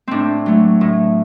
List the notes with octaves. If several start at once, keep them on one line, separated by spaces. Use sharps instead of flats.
A2 C4 D4
F#3 A3
A2